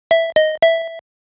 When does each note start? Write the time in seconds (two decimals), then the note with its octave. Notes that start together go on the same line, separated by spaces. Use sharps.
0.11 E5
0.36 D#5
0.62 E5